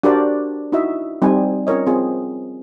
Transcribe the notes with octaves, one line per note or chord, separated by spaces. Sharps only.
D4 F#4 G4 A#4 C5 D5
D#4 E4 F#4 D#5 E5
G3 C4 D#4 G#5
C#4 F4 A#4 C#5 D#5
C4 F4 G#4